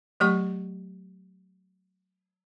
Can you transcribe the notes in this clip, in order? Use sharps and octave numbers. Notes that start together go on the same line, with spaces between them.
F#3 A3 G4 D5 C#6